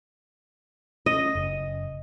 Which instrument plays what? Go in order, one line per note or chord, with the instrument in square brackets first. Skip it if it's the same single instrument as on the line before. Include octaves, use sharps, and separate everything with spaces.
[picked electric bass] C#4 [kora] D#5
[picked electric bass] F#1